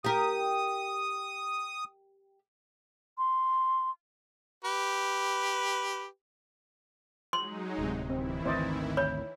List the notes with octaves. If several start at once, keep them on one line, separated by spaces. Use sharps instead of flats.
G4 A#4 D#6
C6
G4 B4
F#3 G#3 D#4 C6
D1 C3
D#3 E3 C4 E4
G#1 D2 C4 C5 D5 D#5
C#5 B5